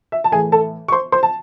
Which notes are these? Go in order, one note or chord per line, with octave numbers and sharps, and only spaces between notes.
E5
A5
A2 E3 G#4 G#5
A4 A5
C#6
C5 C6
C5 C6
A5